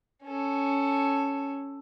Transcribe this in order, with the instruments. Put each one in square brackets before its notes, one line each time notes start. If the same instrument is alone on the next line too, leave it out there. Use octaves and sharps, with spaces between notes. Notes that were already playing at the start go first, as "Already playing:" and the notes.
[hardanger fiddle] C#4 A4